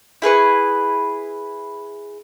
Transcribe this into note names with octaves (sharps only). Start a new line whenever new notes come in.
E4 G#4 B4 C#6